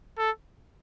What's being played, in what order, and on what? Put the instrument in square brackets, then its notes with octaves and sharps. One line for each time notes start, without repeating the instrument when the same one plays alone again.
[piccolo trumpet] A4